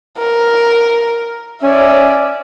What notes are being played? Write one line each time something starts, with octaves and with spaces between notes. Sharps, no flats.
A#4
C#4 D5 E5